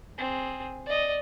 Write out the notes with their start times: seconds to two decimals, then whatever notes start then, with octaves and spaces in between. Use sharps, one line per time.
0.18 C4 G#4
0.86 D5 D#5